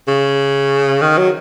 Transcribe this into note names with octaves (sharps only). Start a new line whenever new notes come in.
C#3
D#3
F#3